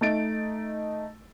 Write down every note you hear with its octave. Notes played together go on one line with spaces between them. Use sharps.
A3 D#4 A6 D7